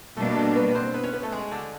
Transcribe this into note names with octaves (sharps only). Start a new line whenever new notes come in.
B2 G3 A3 A#3 D4 A4
A3 A4
B3 B4
B4
C4 C5
B3 B4
C#4 C#5
B3 B4
A3 A4
G#3 G#4
D3 D4